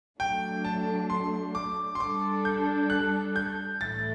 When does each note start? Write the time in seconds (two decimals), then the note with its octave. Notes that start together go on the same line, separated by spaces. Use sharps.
0.20 F#3 A3 D4 G5
0.65 A5
1.10 C6
1.55 D6
1.95 C6
2.00 G3 D4 A4 D6
2.45 G6
2.90 F#6
3.36 G6
3.80 A2 E3 A3 E4 A6